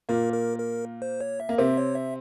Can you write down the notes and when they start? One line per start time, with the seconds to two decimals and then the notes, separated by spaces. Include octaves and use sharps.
0.09 A#2 A#3 A#4
0.33 A#4
0.59 A#4
1.02 C5
1.21 C#5
1.40 E5
1.49 A#3
1.58 C3 C4 E5
1.77 C#5
1.95 E5